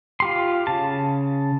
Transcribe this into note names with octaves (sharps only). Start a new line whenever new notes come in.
F4 G4 C6
C#3 A5